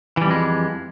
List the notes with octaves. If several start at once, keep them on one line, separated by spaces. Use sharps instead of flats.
F2 E3 G3 G#3